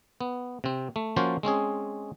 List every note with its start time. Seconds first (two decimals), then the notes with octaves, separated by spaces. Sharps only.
0.21 B3
0.64 C3 C4
0.96 A3
1.16 F3 A#3 C#4 F4 F#4 C5
1.43 G#3 C4 C#4 G#4